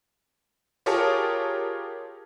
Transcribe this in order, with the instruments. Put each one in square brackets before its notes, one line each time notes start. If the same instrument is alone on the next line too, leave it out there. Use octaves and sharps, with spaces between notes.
[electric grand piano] F4 G4 G#4 A#4 C#5 A5